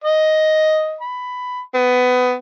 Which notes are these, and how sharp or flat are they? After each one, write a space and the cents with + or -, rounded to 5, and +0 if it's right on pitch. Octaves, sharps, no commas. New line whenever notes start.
D#5 +5
B5 +10
B3 +20